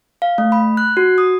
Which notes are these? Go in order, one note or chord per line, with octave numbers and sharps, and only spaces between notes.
F5
A3
B5
F#6
F#4
D#6